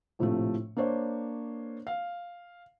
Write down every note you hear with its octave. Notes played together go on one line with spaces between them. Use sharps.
A#1 A2 C3 F3 A3
A#3 D4 C5 C#5
F5